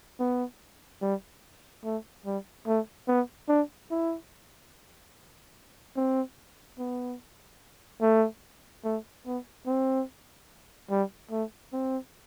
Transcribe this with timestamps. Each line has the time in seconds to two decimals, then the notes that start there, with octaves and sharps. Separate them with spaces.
0.20 B3
1.02 G3
1.85 A3
2.26 G3
2.67 A3
3.08 B3
3.49 D4
3.91 E4
5.97 C4
6.79 B3
8.02 A3
8.85 A3
9.26 B3
9.66 C4
10.91 G3
11.31 A3
11.73 C4